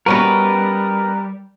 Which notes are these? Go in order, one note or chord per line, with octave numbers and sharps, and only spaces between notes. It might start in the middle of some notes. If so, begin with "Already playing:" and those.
G3 B3 C#4 F#4 A#4 B4 D#5